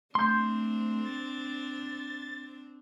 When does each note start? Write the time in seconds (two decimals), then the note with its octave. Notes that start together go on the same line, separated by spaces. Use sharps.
0.15 A3 C4 D4 C6 G6
1.05 A6